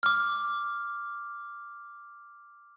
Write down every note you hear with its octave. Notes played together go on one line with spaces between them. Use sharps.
D6 F6